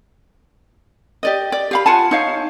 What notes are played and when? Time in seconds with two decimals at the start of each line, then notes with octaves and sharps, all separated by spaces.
1.23 G4 D5 D#5
1.52 D5
1.71 G4 F5 B5
1.86 F4 F#5 G#5 A5
2.11 D#4 C#5 F5